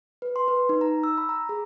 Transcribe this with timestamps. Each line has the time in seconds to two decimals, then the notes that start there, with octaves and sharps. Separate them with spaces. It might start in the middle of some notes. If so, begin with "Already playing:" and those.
0.22 B4
0.36 C6
0.48 B4
0.69 D#4
0.81 A#5
1.04 E6
1.18 B5
1.29 A#5
1.49 G#4